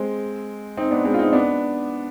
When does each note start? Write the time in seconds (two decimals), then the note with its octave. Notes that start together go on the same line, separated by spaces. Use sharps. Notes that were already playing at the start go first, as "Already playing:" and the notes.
Already playing: G#3 C4
0.77 C4 D#4
0.91 B3 D4
1.05 G#3 C4
1.14 F4
1.19 C4 D#4
1.33 B3 D4